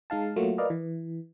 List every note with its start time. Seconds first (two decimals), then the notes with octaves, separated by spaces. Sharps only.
0.10 G#3 D#4 F5 A5
0.36 F#3 A3 A#3 F4 F#4
0.58 A#4 B4 D5 D#5 F5 A#5
0.70 E3